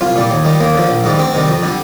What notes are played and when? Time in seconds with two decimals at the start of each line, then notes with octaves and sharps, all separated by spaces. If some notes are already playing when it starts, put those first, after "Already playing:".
0.01 C2 F4
0.16 A#2 G3
0.31 D#2
0.45 D#3 G3
0.60 D#2 A#3
0.75 D3 F3
0.89 A#1
1.04 G#2 D#3 G3
1.19 D2 C4
1.34 C3 D#3 G3
1.48 F2
1.63 D3 G3